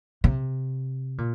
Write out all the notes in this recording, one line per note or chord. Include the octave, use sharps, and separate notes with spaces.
C3
A#2